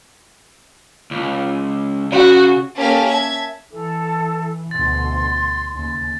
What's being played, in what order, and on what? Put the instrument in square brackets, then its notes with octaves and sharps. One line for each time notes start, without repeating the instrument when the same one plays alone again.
[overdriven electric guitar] C#2
[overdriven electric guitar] C#3 [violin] F#4
[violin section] A#3 C#4 G4 A4 F5
E5 A5 G#6
[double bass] E3 [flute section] A4
[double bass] D2 B2 [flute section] C6 [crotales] A6
[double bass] D#2 C#3